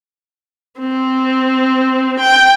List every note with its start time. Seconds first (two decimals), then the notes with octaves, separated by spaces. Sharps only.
0.80 C4
2.19 G5